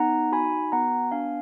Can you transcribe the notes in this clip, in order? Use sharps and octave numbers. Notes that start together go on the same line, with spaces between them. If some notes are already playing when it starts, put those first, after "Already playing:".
Already playing: B3 D#4 F#5 A#5
F#4 G#5 B5
B3 F#5 A#5
D4 F5 G#5